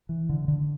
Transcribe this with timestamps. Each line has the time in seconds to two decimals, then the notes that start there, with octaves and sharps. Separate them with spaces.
0.09 E3
0.29 D3
0.48 D3